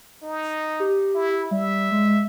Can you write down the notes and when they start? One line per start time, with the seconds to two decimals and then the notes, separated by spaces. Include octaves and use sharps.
0.23 D#4
0.80 G4
1.15 E4
1.51 G3 E5
1.92 G#3